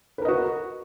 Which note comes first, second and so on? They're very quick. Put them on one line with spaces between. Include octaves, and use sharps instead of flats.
B4 A#4 D#5 F#4